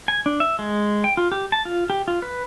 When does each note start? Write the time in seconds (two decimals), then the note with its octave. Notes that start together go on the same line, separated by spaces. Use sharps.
0.08 G#5
0.26 D4
0.40 E5
0.59 G#3
1.04 G5
1.17 F4
1.32 G4
1.52 A5
1.65 F4
1.90 G4
2.08 F4
2.22 B4